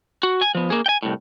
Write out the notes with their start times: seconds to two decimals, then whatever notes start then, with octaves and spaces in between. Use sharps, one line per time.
0.23 F#4
0.41 G#5
0.55 F3 B3
0.70 A#3 G#4
0.86 G5 G#5
1.03 C2 A2